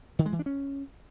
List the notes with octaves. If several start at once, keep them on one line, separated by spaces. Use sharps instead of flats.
D#3
G#3
E3
D4
C#4